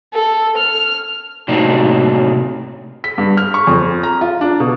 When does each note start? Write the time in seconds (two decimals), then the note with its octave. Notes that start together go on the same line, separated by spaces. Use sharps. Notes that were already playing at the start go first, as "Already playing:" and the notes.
0.14 A4
0.58 F6
1.48 A2 C3 F#3 A#3 D4 D#4
3.04 B6
3.18 G2
3.37 F6
3.54 C#6
3.67 F2
4.03 A#5
4.21 F4
4.41 D4
4.60 B2